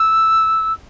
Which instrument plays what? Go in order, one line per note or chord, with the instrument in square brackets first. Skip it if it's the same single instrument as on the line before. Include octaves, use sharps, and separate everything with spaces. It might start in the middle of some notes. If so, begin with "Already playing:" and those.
Already playing: [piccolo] E6